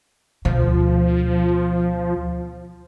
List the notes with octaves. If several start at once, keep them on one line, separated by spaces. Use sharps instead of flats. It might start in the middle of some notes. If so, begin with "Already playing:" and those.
D2 B2 F3